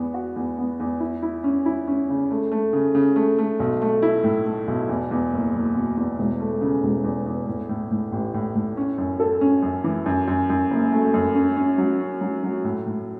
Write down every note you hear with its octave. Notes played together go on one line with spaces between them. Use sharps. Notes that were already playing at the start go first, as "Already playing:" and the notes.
Already playing: E2 B3
F#4
E2
B3
E2
E4
E4
C#4
E4
C#4
C#3
A3
A3
C#3
C#3
A3
A3
B1
A3
E4
A2
A3
B1
E2
E2
F#1
F#1
B2
E2
E1
A3
C#3
E1
E2
E2
A2
A2
A2
A1
A2
A2
C#4
F#2
A4
C#4
F#2
E3
F#2
F#2
F#2
F#1
A3
F#2
C#4
C#4
F#3
C#4
F#3
F#3
A2
A2